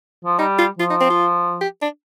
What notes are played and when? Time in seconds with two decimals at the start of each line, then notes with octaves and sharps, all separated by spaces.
0.25 F3
0.39 G3 D#4
0.59 F4
0.79 F3 F4
0.90 D#4
1.00 C4
1.10 F4
1.61 G4
1.82 D4